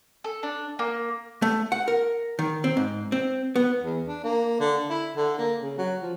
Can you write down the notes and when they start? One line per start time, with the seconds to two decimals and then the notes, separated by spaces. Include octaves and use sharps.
0.24 A4
0.43 D4
0.79 A#3
1.42 A3
1.72 F#5
1.88 A#4
2.39 D#3
2.64 C4
2.77 G#2
3.12 C4
3.56 B3
3.83 E2
4.08 D4
4.24 A#3
4.60 D3
4.90 E4
5.17 D3
5.38 A#3
5.62 C#3
5.78 F#3
6.02 F3